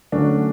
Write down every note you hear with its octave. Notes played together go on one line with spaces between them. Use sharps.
D3 F#3 A3 C#4 D4 F#4